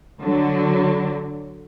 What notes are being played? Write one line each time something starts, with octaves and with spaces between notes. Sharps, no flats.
D3 F#3